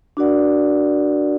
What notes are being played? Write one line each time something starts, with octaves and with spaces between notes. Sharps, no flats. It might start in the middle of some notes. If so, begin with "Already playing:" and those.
D4 F#4 A#4 D5 F#5